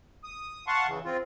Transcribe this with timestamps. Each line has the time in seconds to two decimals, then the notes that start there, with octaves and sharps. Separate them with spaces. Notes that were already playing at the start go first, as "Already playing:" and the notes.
0.24 D#6
0.67 F5 F#5 A5 C6 C#6
0.88 C#3 E3
1.05 C4 F4